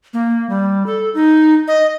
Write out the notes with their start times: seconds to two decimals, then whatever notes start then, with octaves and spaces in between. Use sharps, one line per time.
0.13 A#3
0.49 G3
0.86 A4
1.14 D#4
1.68 D#5